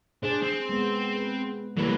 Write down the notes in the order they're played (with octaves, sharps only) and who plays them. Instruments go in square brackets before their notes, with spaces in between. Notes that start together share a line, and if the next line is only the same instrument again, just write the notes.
[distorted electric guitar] D4 [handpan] G#4 C5
[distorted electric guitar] C4
[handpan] G#3 B3
B4
[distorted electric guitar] E3 G3 [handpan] A3 A#3 B4